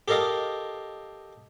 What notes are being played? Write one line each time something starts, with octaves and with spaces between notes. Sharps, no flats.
G4 A4 A#4 D#5 F5